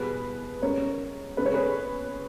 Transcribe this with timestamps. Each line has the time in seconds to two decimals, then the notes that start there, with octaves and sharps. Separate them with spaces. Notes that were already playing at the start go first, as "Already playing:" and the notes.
Already playing: E2 B2 G3 B3 G#4 B4
0.62 C#2 C#3 G3 C#4 A#4 C#5
1.37 C#2 C#3 G#3 C#4 B4
1.45 C#5
1.54 G#4 B4